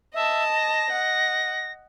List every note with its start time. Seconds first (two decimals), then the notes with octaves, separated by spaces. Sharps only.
0.14 D#5 E5 A5
0.56 A#6
0.90 D#5 F#5